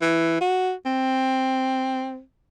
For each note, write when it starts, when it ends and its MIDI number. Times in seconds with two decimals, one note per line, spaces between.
0.01 0.39 52
0.41 0.73 66
0.86 2.21 60